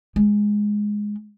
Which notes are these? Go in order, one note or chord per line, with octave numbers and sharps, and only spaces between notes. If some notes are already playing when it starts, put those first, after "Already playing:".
G#3